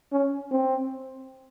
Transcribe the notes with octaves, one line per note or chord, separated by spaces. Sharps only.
C#4
C4